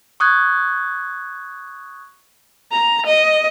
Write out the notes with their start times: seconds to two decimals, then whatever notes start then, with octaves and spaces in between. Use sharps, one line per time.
0.20 C#6 D#6 F#6 G#6
2.72 A#5
3.06 D#5